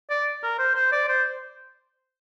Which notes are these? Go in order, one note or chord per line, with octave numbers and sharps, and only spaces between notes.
D5
A#4
C5
C5
D5
C5